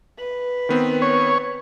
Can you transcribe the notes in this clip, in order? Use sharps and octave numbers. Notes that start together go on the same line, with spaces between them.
B4
D#3 B3 C4
C#5